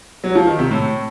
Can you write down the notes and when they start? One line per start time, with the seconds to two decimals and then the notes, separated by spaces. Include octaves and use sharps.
0.24 F#3
0.35 F3
0.47 D#3
0.59 C3
0.71 A2